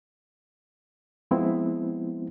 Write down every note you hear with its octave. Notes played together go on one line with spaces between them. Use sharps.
F3 G#3 B3 C4 E4